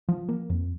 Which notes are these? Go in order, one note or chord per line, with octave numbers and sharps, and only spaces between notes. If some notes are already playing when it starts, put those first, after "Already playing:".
F3
A#3
F2